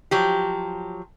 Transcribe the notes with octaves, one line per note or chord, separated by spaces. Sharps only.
F3 F#3 G4